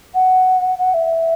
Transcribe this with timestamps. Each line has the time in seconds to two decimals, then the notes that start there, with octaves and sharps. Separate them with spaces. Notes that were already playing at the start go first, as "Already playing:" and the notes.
0.15 F#5
0.79 F#5
0.94 E5